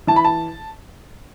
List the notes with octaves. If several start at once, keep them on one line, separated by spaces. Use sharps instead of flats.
E3 A5
B5
A5